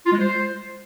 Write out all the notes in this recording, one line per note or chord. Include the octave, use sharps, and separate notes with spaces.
F4
G#3
C5